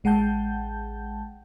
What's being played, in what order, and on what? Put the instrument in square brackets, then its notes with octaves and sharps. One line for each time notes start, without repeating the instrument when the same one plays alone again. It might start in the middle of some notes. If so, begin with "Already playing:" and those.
[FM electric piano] A1 G#3 F#5 G5 A5 G6